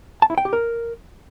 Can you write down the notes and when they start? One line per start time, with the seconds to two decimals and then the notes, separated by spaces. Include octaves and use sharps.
0.22 A5
0.30 E4
0.38 G5
0.45 G4
0.53 A#4